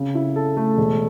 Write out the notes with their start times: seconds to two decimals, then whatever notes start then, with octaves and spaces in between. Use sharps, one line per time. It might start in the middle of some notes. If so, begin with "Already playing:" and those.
Already playing: C#3
0.15 E4
0.36 A4
0.57 A3
0.78 E1